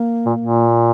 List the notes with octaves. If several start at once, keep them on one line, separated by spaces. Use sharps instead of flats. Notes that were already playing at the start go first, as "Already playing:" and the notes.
Already playing: A#3
A#2
A#2